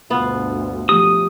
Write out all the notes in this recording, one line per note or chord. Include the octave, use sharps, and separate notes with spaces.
D2 G2 B2 B3 F4
F3 A3 G4 D#6